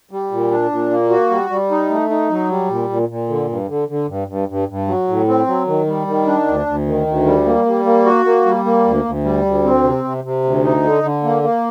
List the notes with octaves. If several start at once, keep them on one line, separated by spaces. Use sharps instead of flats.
G3
A#2
D4
A#2
A#3
F#4
G3
G3
D#4
A3
D#4
F#3
G3
A#2
A#2
A#2
D3
G2
D3
D3
G2
G2
G2
G2
F#3
A2
C4
F#3
D#3
G3
D#3
D4
D2
D2
D#3
D2
G3
A#3
G3
A#3
F#4
A#3
G3
A#3
D2
D2
G3
D2
C4
C3
C3
C3
D2
D#4
D3
D3
A#3
A#3